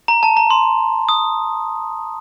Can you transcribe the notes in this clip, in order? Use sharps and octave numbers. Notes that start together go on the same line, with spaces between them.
A#5
A5
A#5
C6
D#6